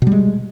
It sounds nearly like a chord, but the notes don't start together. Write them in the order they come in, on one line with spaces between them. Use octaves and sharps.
B2 G3 G#3